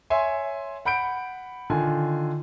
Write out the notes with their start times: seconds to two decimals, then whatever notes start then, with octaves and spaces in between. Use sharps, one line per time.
0.10 C#5 E5 G#5 C6
0.85 F#5 B5 G6 D7
1.70 D3 D#3 F4 G#5